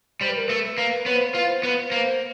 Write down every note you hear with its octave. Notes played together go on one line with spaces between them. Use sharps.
G3 C5
B4
A#4
A3 B4
B4
A#3
B3 C#5
C5
B4
C5
F4
B3
A#3